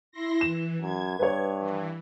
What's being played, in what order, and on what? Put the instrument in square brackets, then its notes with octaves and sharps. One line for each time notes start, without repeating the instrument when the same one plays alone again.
[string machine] E4 C6 A#6
[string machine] E3 [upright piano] E7
[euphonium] F#2 [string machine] G#6
[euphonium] G2 [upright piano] B4 C#5
[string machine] E3